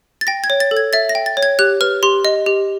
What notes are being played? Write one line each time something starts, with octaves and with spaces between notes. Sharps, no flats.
A6
G5 A#6
G#6
C#5
A6
A4
G#6
E5 A6
A#6
G5
A6
C#5
G#6
G4 F#6
B4 F6
G4 C6
D#5
G4